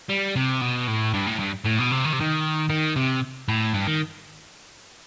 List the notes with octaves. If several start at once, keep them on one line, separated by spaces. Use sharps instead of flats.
G3
C3
B2
A2
G2
A2
G2
A2
B2
C3
D#3
C3
D#3
D#3
C3
A2
G2
D#3